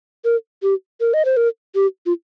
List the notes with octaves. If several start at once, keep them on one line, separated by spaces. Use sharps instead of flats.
A#4
G4
A#4
D#5
C5
A#4
G4
F4